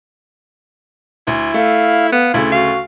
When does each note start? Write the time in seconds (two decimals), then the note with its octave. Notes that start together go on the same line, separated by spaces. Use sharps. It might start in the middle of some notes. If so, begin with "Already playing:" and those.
1.27 D2 E4
1.54 A3 F5
2.12 B3 F5
2.34 D2 C#3 A3 E4
2.52 F#4 F5